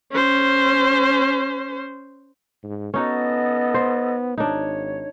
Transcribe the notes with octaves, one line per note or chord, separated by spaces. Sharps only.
C#4 C5
G#2
B3 C#4 D#4 F#4 A4 D#5
C5
G#1 D4 D#4 C#5